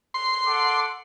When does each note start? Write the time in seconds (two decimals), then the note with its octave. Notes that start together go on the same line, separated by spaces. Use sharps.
0.14 C6
0.47 A4 F#5 D6